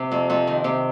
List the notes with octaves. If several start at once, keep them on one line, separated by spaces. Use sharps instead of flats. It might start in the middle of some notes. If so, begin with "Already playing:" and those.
Already playing: C3
F2
F2
D#3
C3